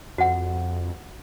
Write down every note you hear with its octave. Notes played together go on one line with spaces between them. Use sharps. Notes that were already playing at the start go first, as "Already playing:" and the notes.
F2 F#4 F#5